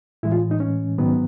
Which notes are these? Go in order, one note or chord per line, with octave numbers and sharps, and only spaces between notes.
A2 E3 G#3 E4
F4
D#4
C#4
G#2 D#3 F#3 B3